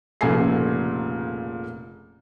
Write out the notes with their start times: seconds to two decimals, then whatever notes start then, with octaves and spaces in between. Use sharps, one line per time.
0.21 F1 A#2 C#3 A4 G#5 C7